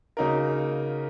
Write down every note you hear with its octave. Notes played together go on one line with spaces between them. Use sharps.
C#3 A#3 D#4 F#4 A#4